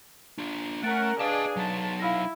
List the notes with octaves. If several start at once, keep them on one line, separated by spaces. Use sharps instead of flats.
D4 F4
A3 C#4 A#4 F#5 A6 D7
D4 G#4 B4 D5 D#5 F5 A5
F#3 D#4 A5
E4 F5 F6 A#6